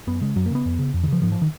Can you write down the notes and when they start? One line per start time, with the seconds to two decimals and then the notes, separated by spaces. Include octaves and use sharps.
0.07 F#2 B3
0.21 C#3 G#3
0.36 F#2 F#3
0.46 A#3
0.50 C#3 B3
0.65 F2
0.79 C#3
0.94 F2
1.03 D#3
1.08 C#3 F3
1.22 G#2 F3
1.32 F3
1.42 D#3